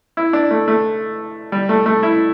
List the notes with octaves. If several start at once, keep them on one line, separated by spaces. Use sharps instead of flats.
E4
D4
A3
A3
G3
A3
A3
E4